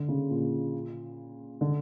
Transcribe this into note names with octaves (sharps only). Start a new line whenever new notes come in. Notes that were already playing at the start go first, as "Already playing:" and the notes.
Already playing: D3
C#3
A#2
D3